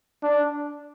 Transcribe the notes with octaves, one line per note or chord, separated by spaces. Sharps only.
D4